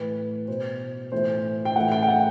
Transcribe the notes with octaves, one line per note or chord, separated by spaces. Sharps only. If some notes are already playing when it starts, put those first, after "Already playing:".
Already playing: A2 E3 B4
B2 C5
A2 E3 C5
G5
A2 E3 F#5
G5
G5
F#5